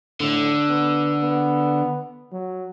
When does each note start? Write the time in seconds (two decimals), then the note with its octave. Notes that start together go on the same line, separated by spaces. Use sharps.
0.20 A2 D3
0.69 B3
1.22 B3
2.32 F#3